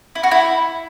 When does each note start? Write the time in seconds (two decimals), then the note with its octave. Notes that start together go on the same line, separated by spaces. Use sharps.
0.15 E4
0.23 F#4
0.31 E4